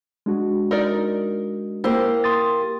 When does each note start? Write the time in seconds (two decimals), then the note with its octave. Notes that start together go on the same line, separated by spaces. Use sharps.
0.26 G#3 D4 F#4
0.71 D#4 A#4 D5
1.84 A#3 E4 G4 C5
2.24 C6 D#6 A6